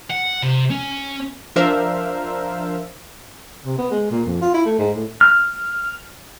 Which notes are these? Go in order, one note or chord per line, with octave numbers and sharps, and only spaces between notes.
F#5
C3
C#4
F3 D4 A#4 C5 E5 F5
C3
B3
G#3
A#2
F2
F4
E4
A3
G#2
A2
F6